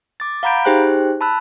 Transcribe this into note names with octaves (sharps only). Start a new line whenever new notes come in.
D6 A6
F5 F#5 A#5 B5 G6 D7
D#4 G4 G#4 C5 G5 F#6
A5 B5 E6 F#6